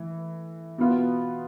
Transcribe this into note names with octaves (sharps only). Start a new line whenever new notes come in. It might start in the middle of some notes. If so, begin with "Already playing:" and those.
Already playing: E3 A3
B2 B3 F4